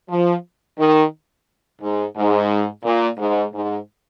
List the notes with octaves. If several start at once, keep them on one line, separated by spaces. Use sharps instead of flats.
F3
D#3
G#2
G#2
A#2
G#2
G#2